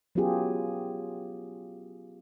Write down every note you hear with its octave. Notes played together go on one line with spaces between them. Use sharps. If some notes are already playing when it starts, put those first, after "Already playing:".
F#3 B3 C#4 F4 G4 G#4